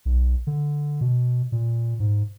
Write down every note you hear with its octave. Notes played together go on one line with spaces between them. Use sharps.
B1
D3
B2
A#2
G#2